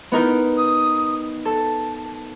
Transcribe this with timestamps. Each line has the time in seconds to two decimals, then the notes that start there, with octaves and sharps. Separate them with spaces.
0.12 B3 D#4 E4 A#4
0.57 D#6
1.45 A4 A5